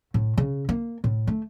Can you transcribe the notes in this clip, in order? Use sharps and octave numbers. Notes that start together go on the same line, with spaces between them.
A2
C#3
A#3
A2
A3